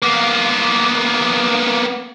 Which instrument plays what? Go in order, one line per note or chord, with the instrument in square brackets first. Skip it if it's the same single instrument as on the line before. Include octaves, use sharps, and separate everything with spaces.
[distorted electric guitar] A#3 B3